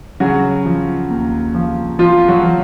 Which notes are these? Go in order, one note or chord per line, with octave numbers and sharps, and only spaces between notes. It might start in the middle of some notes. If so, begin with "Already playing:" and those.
C#3 F#3 F#4
F3
D#2
F3
F3 F4
F#3 F#4
F3